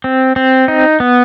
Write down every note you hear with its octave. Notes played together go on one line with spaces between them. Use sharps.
C4
C4
D#4
B3